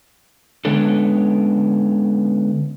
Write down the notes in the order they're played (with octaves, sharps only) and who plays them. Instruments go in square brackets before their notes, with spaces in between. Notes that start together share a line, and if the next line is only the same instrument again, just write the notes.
[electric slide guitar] D3 G#3 B3 C#4 D4 A4